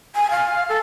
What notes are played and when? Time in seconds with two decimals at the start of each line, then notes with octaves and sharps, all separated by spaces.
0.15 G#5
0.31 F5
0.69 A4